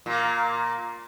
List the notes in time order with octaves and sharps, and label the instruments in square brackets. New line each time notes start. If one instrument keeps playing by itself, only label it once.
[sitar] A#2 A#3